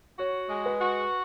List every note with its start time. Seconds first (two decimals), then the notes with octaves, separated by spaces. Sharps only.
0.19 F#4 C#5
0.50 G#3
0.66 B4
0.81 F#4